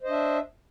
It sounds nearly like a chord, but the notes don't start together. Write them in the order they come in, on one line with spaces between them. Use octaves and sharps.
C5 D#5 D4 E5